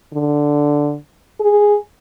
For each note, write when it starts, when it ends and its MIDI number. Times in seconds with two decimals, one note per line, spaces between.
0.13 0.95 50
1.40 1.77 68